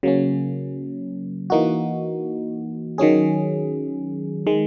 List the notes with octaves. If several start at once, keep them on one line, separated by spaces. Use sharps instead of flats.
C#3 F#3 A#3 C#4
E3 A#3 D#4 F#4
D#3 F#3 C#4 G#4
D#3 G#3